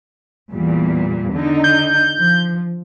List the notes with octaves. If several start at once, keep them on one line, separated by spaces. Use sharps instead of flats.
E2 A#2 G3
D3 D#4
G6
F3